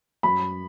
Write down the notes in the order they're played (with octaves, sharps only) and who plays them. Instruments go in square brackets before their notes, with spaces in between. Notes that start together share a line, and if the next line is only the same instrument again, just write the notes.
[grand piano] F#2 B5